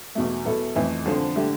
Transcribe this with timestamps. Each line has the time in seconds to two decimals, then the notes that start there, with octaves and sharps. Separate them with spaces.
0.15 E2 B2 A3
0.45 B2 B3 E4 A4
0.75 F2 E3 A3
1.06 D3 F3 C4
1.36 D3 A3 E4 G4